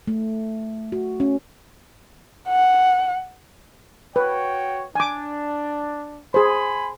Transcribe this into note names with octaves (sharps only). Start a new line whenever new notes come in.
A3
F#4
C#4
F#5
F#4 B4 C#5 G5
D4 G#5 D6
G#4 C5 G#5 B5 C6